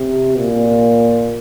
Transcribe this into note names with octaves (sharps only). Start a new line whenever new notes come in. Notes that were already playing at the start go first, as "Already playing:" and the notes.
Already playing: C3
A#2